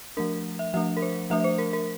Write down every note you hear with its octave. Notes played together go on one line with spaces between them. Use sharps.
F3 A3 D4 A#4
E5
F3 A3 D4 E5
A#4
C5
F3 A3 D4 E5
C5
A#4
A#4